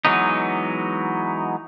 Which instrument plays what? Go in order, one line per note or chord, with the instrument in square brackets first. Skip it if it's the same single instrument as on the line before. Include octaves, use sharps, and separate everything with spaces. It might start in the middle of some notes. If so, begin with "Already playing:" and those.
[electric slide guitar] E3 F#3 G#3 B3 D#4